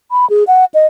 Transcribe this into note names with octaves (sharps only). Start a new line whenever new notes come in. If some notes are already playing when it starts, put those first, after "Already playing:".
B5
G#4
F#5
D#5